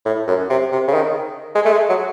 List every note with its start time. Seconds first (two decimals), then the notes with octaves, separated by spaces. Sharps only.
0.05 A2
0.27 F#2
0.50 C3
0.72 C3
0.88 C#3
0.94 D#3
1.55 G#3
1.65 A3
1.72 G#3
1.89 F#3